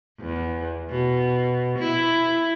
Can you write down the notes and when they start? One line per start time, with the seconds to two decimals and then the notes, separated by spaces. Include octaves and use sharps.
0.20 E2
0.90 B2
1.79 E4